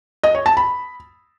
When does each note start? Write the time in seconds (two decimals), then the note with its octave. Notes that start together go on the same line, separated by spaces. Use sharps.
0.23 D#5
0.35 C#5
0.46 A5
0.57 B5